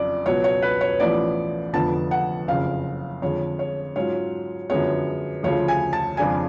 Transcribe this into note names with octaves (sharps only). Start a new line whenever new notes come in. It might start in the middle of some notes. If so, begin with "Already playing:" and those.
Already playing: F#1 F2 F3 D5
C#2 B2 F#3 C#5
C#5
B4
C#5
A1 A2 F3 B3 D5
F1 F2 D3 F3 B3 A5
F#5
F#1 F2 C#3 F5
F2 D3 G#3 C#5
C#5
G#2 F#3 C#4 F4 C#5
F#2 D3 F3 G#3 B3 C#5
D2 C#3 F3 C#5
G#5
A5
F2 C#3 F3 G#3 D4 G#5